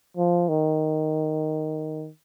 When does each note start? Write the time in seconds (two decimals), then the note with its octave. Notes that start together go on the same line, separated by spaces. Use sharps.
0.17 F3
0.49 D#3